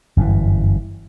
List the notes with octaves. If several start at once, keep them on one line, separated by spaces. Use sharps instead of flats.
G1 F#2 D3 E3